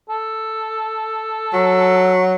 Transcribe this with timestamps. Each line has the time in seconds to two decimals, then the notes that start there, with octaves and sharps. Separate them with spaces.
0.09 A4
1.53 F#3